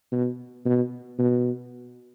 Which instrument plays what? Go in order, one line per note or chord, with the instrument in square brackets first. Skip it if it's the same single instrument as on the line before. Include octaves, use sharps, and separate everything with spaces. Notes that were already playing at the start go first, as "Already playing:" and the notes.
[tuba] B2
B2
B2